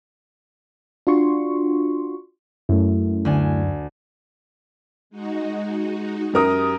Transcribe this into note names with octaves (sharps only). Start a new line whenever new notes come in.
D4 F4 F#4 C6 C#6
F#2 A3 E4
D2 D4 G#5
G#3 D#4 F#4
F#2 G4 A#4 D#6